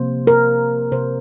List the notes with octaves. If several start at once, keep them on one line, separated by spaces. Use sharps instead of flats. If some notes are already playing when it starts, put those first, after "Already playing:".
Already playing: C3 F3 A#3 C5
A#4
C3 F3 A#3 C5